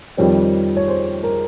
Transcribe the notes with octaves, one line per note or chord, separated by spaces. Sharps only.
F2 D#3 G3 C4 C#5
C#5
C5
A#4